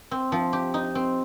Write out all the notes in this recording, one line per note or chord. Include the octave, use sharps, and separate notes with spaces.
C4
F3
G4
D#4
C4